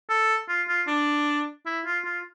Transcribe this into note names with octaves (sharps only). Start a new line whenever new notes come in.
A4
F4
F4
D4
E4
F4
F4